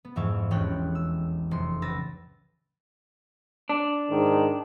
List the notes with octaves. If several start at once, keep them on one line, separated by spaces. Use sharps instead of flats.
B3
F2 G#2 E3 E5 F5 C#6
E1 A1 C#5 G5 F#6
E6
F1 C6 C#7
C#2 B4 B5 E6 A6 A#6
D4
G#2 D#3